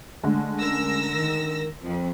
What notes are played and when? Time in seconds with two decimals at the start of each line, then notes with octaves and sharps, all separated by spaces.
0.23 D3 G#3 A3
0.61 C#4 A#4 E6 A#6
1.14 D#3
1.82 F2 F3 C4